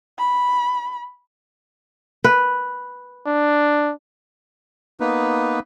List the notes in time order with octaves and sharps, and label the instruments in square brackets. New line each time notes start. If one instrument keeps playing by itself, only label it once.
[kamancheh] B5
[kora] B4
[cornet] D4
[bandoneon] A#3 B3 D#4 B4